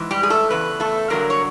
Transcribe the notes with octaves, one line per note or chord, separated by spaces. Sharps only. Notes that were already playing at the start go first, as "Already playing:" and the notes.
Already playing: G#2 E3
G3 G4
G#4
A3 A4
E2 C#3 B4
A3 A4
G2 D3 F#3 A#3 A#4
C#5